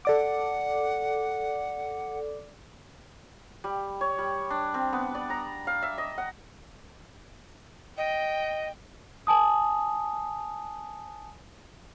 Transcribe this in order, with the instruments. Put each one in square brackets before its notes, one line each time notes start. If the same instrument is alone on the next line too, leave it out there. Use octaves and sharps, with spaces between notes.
[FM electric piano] A4 D5 D6 [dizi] F#5
[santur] G3
C#5
G3
D4
C4
B3
D5
A#5
F5
E5
D#5
F#5
[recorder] D#5 [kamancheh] G5
[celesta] G#5 A5 D#6